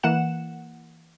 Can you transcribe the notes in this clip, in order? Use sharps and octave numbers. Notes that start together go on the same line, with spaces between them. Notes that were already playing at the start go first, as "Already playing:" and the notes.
E3 A#3 F#5 E7